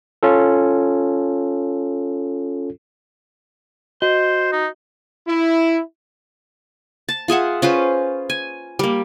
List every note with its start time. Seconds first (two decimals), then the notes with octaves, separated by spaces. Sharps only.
0.23 C#4 F4 A4
4.02 F#4 C5 D#5
4.52 D#4
5.28 E4
7.09 A5
7.28 F4 G#4 E5 F#5
7.62 C#4 F4 B4 C5
8.30 G#5
8.79 G3 A#3